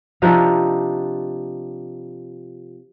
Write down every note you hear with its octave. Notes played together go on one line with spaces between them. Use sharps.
C3 F3 D4 D#4